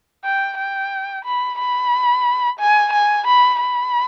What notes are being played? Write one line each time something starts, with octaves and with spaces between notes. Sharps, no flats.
G5
G5
B5
B5
G#5
G#5
B5
B5